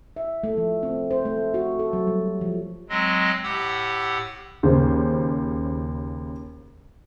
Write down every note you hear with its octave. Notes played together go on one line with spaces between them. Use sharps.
E5
A3
F3
C4
C5
A3
F#4
A4
F#3
G3
F3
F#3 G#3 C4 D#5
A2 G4 F#5 E6
D#2 C#3 C5